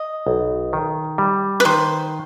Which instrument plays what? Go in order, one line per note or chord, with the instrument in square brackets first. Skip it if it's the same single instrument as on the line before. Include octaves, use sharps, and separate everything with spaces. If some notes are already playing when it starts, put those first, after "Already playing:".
Already playing: [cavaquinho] D#5
[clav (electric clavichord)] B1
D#3
G3
[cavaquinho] B4
[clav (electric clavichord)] D#3 [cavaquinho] C5